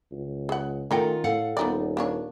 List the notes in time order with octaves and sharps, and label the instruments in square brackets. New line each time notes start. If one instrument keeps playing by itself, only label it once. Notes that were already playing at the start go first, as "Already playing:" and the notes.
[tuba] C#2
[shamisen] G#4 F#5
[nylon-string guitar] D#3 F4 F#5 [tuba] A3 [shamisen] C#4 A#4 G5
[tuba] A2 [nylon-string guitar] A4 F5 F#5
[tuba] D#1 [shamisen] B3 D#4 D5
[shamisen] A#3 D4 C#5